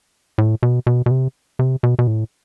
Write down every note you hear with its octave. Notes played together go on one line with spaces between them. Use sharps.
A2
B2
B2
B2
C3
C3
B2
B2
A2